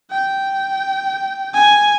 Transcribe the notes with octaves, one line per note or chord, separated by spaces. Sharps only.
G5
G#5